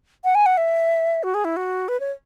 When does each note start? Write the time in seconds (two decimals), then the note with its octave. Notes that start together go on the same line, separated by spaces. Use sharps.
0.24 F#5
0.35 G#5
0.46 F#5
0.57 E5
1.23 F#4
1.34 G#4
1.45 E4
1.56 F#4
1.88 B4
2.00 C#5